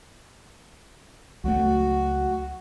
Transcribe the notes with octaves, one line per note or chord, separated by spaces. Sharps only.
C#2 F#3 A3 F#4